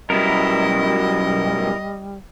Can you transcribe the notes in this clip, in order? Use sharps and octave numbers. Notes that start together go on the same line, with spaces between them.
F#2 B2 G3 E4 A#4 D#5